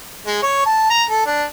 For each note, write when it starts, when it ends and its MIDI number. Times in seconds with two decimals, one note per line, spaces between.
0.26 0.38 56
0.42 0.61 73
0.66 0.85 81
0.90 1.04 82
1.10 1.23 69
1.26 1.44 62